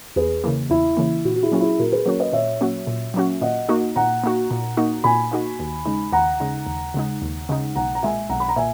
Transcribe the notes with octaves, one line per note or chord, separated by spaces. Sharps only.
E2 G#4 B4
C#3 E3 A#3
E2 E4
C#3 E3 A#3
A#2 F#4
F#4
E4 G#4
F#3 A#3 C#4 F#4
E4 G#4
A#2 F#4 A#4
G#4 B4
F#3 A#3 C#4 F#4 A#4 C#5
B4 D#5
A#2 C#5 E5
F#3 A#3 C#4 F#4
A#2
F#3 A#3 C#4 F#4
A#2 D#5 F#5
A#3 D#4 F#4
A#2 F#5 A#5
A#3 D#4 F#4
A#2
A#3 D#4 F#4
A#2 G#5 B5
A#3 D#4 F#4
D#2
C#3 G#3 D#4
D#2 F#5 A#5
C#3 G#3 D#4
D#2
C#3 G#3 D#4
D#2
C#3 G#3 D#4
B1 F#5 A#5
A#5
A#2 G#3 E5 G#5
B1 F#5 A#5
B5
A#5
A#2 E5 G#5